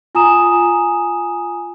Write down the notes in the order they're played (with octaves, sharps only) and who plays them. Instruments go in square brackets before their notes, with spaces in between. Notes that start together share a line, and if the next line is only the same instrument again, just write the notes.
[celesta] F4 G#5 A#5 D#6 E7